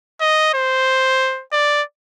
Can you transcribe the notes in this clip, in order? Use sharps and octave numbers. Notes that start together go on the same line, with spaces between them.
D#5
C5
D5